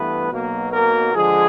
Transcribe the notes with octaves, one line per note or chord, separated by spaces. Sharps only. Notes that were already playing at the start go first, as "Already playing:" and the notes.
Already playing: G2 E3 A3 B3 B4
B1 B2 F#3 A#3
A#3 A#4
D3 F3 G#3 G#4